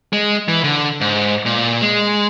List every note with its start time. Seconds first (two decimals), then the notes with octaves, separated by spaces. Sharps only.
0.13 G#3
0.48 E3
0.64 D3
1.01 G#2
1.46 A#2
1.82 G#3